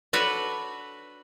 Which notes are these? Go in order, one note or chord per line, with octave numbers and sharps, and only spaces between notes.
D4 F#4 A4 B4 C#5